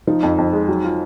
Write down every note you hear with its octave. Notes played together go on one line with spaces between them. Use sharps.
F3 D#4
F2
F2
G#3
F#3
F4